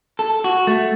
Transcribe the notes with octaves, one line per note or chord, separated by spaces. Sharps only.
A4
F#4
A3